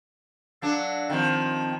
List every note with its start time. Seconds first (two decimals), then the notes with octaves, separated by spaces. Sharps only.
0.62 F#3 D4 A4 D5 F5
1.10 D#3 F3 C4